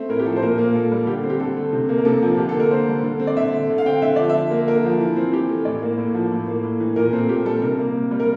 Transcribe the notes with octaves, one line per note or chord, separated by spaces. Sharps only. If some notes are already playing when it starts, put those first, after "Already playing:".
Already playing: A3 C4 E5
A2 A#4
G4
F3 A4
C5
A#2 A#4
A#3
A#2 A4
G3
D3 G4
C4
G4
D3 A4
A3
C3
A#3
A#4
C3 A4
F3
D3 G4
A4
A#3 A#4
D3 C5
G3
D3
C4
D5
D3 E5
A3
D3
F5
C4 G5
D3 E5
F3 D5
E5
D3
A#3
D3 A#4
F3
E3
C4
E3 G4
A3
A2 D5
A#3
A2
F3
A2
A#3
A2
E3
A#2 A#4
C4 A4
A#2 G4
G3 A4
C3 A#4
A#3
C3
G3
A#4